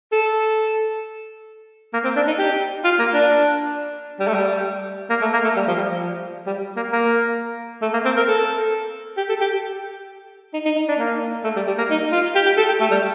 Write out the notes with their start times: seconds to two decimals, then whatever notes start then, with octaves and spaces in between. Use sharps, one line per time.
0.12 A4
1.94 A#3
2.04 C4
2.16 D4
2.27 D#4
2.39 G4
2.84 F4
2.99 A#3
3.14 D4
4.20 G3
4.28 A3
4.34 G3
5.10 A#3
5.22 A3
5.33 A#3
5.44 A3
5.56 G3
5.68 F3
5.78 G3
5.90 F3
6.47 G3
6.76 A#3
6.92 A#3
7.82 A3
7.93 A#3
8.05 C4
8.17 A#4
8.28 A4
9.17 G4
9.29 A4
9.41 G4
10.53 D#4
10.65 D#4
10.76 D#4
10.88 D4
10.99 A#3
11.44 A3
11.56 G3
11.67 G3
11.78 A#3
11.90 D#4
12.12 F4
12.35 G4
12.46 G4
12.57 A4
12.68 G4
12.80 A3
12.91 G3